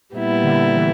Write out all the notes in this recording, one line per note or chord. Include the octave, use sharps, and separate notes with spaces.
A#2 G3 B3 E4
D3
E3